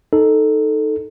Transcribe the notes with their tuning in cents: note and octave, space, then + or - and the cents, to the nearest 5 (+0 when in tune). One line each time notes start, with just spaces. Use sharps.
D#4 +0 A4 +0